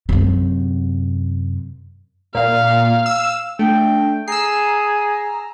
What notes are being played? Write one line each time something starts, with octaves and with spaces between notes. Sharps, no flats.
F#2 C3
A#2 F5
E6
A3 D4 G5
G#4 A#5 E6 C7